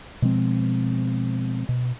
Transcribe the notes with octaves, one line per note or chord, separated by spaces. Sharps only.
B2 F3 G#3 C4
B2